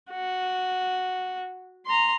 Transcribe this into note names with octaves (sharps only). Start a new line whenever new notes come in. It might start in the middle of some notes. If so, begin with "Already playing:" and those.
F#4
A#5 C6